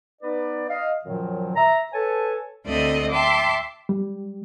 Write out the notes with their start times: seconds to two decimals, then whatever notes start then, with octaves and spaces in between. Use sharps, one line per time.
0.22 B3 D#4 B4 D5
0.69 D#5 F5
1.04 F#2 A#2 D#3 F3 F#3
1.56 E5 A#5
1.92 A4 B4 C#5 G#5 A5
2.66 D2 A3 C4 A4 D5 D#5
3.10 E5 G5 A5 C6 D6
3.89 G3